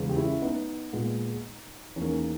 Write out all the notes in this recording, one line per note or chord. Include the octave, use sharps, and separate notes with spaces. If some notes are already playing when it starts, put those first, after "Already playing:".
Already playing: E2 C#3 G#3 B3
G4
C#4 E4
B3 D#4
A#2 G#3 B3
E2 D#3 A#3 C#4